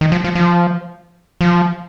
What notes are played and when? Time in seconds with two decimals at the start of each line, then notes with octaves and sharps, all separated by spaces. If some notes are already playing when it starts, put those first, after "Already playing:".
0.01 D#3
0.12 F3
0.24 F3
0.35 F3
1.41 F3